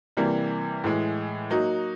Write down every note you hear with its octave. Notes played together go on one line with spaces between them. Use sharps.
C3 E3 G3 A#3
A2 E3 G#3
F#3 A#3 D#4 F#4